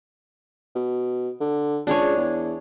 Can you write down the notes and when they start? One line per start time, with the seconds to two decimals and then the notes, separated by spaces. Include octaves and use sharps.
0.75 B2
1.41 D3
1.87 C#2 D4 G#4 C#5
2.17 E2